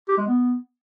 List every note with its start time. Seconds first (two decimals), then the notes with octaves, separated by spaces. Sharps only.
0.09 G4
0.18 G#3
0.27 B3